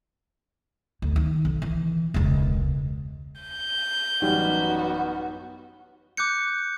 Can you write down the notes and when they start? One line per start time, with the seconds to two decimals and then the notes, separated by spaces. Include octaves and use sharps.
1.02 D2
1.16 D#3
1.45 B1
1.62 E3
2.14 E1 C#2
3.41 G6
4.22 A1 F#2 G3 B3 D#4 F#4
6.17 D6 F#6 G6 C#7